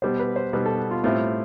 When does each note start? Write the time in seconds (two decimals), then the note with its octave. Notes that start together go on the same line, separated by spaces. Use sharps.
0.02 B2 G3 B3 C5
0.19 B4
0.36 C5
0.53 B2 G3 B3 B4
0.66 A4
0.91 F4
1.04 A2 G3 C4 E4 F4